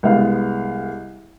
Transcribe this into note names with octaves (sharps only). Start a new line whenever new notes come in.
C2 G#3 B3 F5